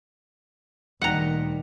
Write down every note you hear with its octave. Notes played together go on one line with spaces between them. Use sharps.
D2 A#2 D#3 G3 D#4 F#5 G5 A#5